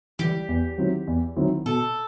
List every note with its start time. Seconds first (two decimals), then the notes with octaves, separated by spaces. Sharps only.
0.19 E3 G3 G4
0.48 E2
0.78 D#3 F#3 C4 E4
1.07 E2
1.36 D#3 F#3 C4 E4
1.66 B2 A4